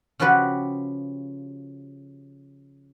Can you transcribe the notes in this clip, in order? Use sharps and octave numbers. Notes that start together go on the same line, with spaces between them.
C#3 F3 F#4 G4 B4